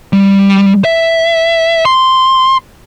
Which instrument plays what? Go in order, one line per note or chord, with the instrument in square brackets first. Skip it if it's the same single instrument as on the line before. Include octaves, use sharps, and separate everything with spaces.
[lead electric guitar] G3
E5
C6